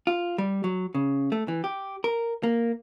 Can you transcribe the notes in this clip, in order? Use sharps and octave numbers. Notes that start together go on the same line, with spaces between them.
F4
G3
F#3
C#3
A3
E3
G4
A#4
A#3